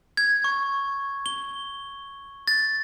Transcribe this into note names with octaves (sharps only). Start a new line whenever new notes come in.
G#6
C#6
G7
A6